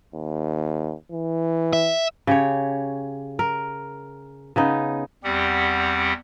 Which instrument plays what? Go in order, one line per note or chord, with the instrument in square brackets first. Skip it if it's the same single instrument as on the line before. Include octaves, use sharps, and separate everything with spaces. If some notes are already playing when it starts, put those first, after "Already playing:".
[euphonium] D#2
E3
[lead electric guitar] E5
[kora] C#3 G4 C#5
A#4
C#3 B3 D#4
[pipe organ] E2 G3 C4 G4 F#5